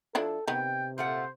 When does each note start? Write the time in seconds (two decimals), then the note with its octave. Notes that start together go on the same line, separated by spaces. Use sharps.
0.15 F3 D4 E4 A4
0.48 C3 D#3 B3 G5
0.98 A#2 A3 C5 F#5